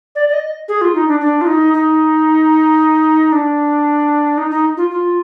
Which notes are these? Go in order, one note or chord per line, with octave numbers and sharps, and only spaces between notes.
D5
D5
D#5
G#4
F4
D#4
D4
D4
F4
D#4
D#4
D4
D#4
D#4
F4
F4